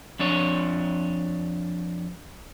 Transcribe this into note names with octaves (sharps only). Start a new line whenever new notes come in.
F2 D4 C#5